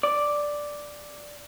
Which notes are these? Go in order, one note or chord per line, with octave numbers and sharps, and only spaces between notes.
D5